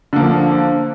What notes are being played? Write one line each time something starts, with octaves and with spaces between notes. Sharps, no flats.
D3 F3 A#3